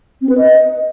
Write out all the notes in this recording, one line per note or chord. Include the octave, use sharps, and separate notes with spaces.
C4
B4
D#5